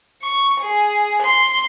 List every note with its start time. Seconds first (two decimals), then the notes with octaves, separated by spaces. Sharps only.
0.22 C#6
0.61 G#4
1.22 C6